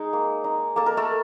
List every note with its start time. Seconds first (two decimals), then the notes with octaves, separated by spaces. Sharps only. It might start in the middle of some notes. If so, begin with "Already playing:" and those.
Already playing: G#3 D#4 G#4
0.13 A#3
0.44 D#4
0.76 A#3 A4
0.86 A#4
0.97 A3 A4